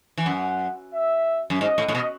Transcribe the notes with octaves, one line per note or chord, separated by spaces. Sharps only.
E3
F#2 F#5
E5
F#2
G#2 D#5
A2
A2
B2